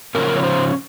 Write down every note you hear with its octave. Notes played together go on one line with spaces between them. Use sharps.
C#3 F3 C#4 A#4
C#5
C5